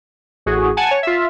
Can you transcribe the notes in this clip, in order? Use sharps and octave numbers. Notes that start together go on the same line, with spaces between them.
A1 F#4 G#4
F#5 G#5 A5
C#5
F4 E5